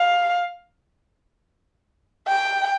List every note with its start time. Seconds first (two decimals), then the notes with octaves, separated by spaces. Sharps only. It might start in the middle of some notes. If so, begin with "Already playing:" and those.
Already playing: F5
2.28 G5